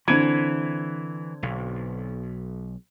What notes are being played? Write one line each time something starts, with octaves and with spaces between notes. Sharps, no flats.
D3 E3 C4 G#6
B1